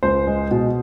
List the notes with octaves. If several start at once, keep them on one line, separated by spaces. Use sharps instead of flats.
C#2 C5
G#3
B2